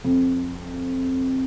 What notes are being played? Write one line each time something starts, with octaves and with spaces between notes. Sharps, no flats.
F2